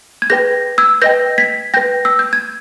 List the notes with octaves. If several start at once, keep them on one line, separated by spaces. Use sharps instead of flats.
G#6
G#4 B4 G5 G6 A#6
E6 G#6
B4 D#5 G5 G6 A#6
G#6 B6
B4 G5 G6 A#6
E6
G6
G#6